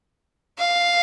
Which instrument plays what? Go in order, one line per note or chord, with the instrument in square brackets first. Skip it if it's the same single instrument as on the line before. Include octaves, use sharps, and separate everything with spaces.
[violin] F5